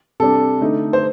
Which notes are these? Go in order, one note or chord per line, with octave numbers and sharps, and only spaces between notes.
C3 G3 D4 A4
D3 A3 D#4
C5